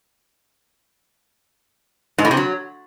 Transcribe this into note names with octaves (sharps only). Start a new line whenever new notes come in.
G#2
A2
C3
F#3